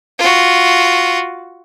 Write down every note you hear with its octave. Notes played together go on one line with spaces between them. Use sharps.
F4 F#4